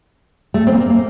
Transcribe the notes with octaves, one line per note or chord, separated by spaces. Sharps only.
A3
C4
A#3
A#3